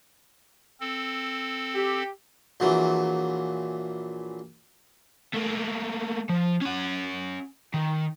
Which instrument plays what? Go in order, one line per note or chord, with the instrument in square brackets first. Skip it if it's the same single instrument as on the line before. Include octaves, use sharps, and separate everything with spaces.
[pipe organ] C4 A4
[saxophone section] G4
[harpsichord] A#1 A#2 E3 F#3
[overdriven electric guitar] A3 A#3
F3
C#4 F#5
D#3